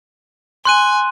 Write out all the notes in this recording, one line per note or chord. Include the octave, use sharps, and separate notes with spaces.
G#5 C6 F#6 D#7